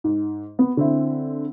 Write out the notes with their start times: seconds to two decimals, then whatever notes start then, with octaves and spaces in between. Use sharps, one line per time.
0.04 G#2
0.59 B3
0.77 D3 C4 E4